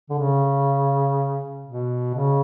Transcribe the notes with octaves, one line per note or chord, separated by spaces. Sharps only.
D3
C#3
B2
C#3